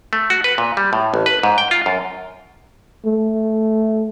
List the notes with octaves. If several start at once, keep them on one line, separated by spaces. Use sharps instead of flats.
A3
F#4
B4
A#2
G3
A2
A1
B4
G#2
G5
F4
F#2
A3